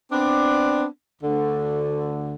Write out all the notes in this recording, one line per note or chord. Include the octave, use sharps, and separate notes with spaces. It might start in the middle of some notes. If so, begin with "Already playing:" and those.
B3 C4 D4
D2 D3